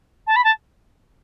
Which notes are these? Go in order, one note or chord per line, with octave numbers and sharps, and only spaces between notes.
A5
B5
A5